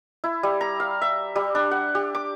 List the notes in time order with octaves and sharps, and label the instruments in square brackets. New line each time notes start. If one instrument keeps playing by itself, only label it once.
[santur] E4
G3
A#5
F5
E5
G3
D4
F#5
G4
D6